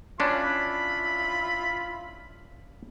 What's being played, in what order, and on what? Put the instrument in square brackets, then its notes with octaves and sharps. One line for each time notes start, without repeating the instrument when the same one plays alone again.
[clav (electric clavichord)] C#4 D4 [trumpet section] E4 F4 B5